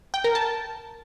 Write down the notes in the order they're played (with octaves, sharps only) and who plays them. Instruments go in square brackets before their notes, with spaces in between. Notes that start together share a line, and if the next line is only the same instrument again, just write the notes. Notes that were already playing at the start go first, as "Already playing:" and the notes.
[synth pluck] G5
A#4
A5